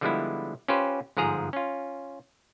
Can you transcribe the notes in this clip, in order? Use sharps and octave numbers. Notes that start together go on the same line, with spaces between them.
D3 F3 G3 G#3 B3 E4
C#4 F4 G4 B4 C5
G1 G#2 F3 G#4 A#5
C#4 F4